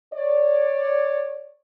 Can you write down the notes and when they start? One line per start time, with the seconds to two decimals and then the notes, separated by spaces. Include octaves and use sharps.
0.14 C#5 D5